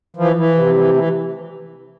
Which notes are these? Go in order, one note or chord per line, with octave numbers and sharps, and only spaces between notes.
E3 F3
E3
C3 F3
F3
E3 G3
F3
E3 A3